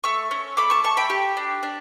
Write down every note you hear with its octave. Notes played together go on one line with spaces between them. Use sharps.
A3 C#6 E6
C#4
A3 B5 D6
A5 C#6
A3 A5 C#6
G5 B5
G4
D4
D4